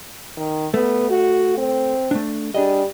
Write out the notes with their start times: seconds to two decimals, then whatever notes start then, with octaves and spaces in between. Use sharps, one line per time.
0.37 D#3
0.74 A3 B3
1.10 F#4
1.58 C4
2.11 A3 D4
2.55 G3 D4 G#4 D#5